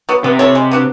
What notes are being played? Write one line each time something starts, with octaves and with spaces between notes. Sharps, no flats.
F#3 B3
C3 B3
E4 A4 C#5
G#3
B3 D4 F#4